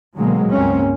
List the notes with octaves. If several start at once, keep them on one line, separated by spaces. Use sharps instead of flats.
B2 D3 F#3 G#3 A#3 C4
C#2 G2 A#3 C4 C#4